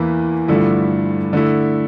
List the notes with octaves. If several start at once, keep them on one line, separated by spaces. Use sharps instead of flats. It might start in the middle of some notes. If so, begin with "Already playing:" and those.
Already playing: E2 E3 A#3 E4
G2 D3 F3 A3 E4
D3 A3 E4